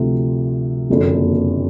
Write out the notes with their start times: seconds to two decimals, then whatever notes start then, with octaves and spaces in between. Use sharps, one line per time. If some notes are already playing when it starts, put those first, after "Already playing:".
Already playing: D2 C3 F3
0.89 F#1 F2 D3 F#3 A#3